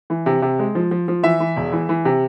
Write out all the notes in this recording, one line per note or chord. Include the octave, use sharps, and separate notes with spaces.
E3
C3
C3
G#3
F3
F3
F3
E3 E5
E3
E1
E3
E3
C3